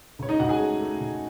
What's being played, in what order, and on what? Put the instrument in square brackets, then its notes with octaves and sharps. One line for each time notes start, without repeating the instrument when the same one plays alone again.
[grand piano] C#2 C#5
D#4 D#5
C#2 F#4 F#5
G#4 G#5
A3
A3
C#2